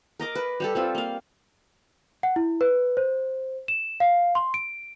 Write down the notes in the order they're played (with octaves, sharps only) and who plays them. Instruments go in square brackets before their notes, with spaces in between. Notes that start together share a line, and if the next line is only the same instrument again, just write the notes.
[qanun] A#4 D#5 D6
B4
G3 G4 A4
G3 C4 F4
A#3 F5
[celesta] F#5
E4
B4
C5
E7
F5
C6
D7